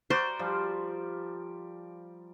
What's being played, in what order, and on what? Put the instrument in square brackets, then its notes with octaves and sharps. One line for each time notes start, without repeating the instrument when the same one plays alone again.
[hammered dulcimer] F#4 A#4 D5 [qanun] C5
[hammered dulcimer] F3 G3